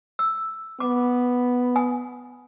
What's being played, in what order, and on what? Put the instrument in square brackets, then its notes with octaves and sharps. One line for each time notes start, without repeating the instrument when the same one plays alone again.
[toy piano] E6
[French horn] B3 [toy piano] D6
[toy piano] G#5 D#6